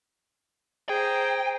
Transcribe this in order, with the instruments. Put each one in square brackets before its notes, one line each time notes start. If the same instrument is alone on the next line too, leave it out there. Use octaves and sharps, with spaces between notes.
[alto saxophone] G#4 [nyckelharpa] C5 A#5 [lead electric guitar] G5